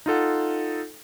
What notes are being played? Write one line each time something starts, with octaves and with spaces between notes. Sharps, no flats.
D#4 F4 A4 F#5